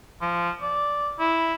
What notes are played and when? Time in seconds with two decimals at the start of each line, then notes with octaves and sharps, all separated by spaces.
0.21 F3
0.62 D5
1.19 E4